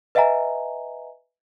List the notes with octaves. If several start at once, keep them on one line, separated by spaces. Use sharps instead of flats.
B4 D#5 E5 F#5 G#5 A#5